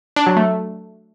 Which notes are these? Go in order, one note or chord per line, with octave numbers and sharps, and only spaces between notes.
D4
F#3
A3